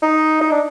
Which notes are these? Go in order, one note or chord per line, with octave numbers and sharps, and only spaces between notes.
D#4
D#4
D4